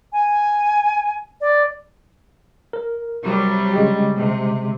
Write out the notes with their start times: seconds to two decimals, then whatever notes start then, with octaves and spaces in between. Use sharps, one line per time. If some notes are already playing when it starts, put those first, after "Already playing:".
0.13 G#5
1.41 D5
2.73 A#4
3.22 C3 F#3 G3
3.73 C#3 G#3 G4
4.17 C3